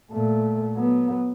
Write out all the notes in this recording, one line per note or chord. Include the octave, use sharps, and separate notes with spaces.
A#2 A3
F#3 B3